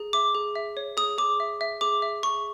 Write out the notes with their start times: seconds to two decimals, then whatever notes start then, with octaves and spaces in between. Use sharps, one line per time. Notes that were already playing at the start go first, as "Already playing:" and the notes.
Already playing: G#4
0.13 E5 D6
0.35 G#4
0.55 E5
0.77 C#5
0.97 G#4 D#6
1.18 G#4 D6
1.40 E5
1.61 E5
1.81 G#4 D6
2.02 E5
2.23 G#4 C#6